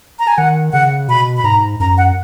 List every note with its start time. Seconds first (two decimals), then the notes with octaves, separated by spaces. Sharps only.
0.19 A#5
0.27 G#5
0.38 D#3 F#5
0.72 C#3 F#5
1.08 B2 B5
1.37 B5
1.44 G#2 A#5
1.80 F#2 A#5
1.98 F#5